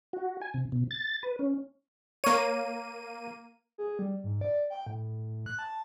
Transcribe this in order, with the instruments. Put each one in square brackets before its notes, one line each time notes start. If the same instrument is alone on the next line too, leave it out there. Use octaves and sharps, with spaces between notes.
[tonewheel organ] F#4
G#5
C3
B2
A6
B4
C#4
[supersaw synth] A#3 D#7 [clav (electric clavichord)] C#5
[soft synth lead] G#4
G3
G#2
D5
G5
A2
F#6
A5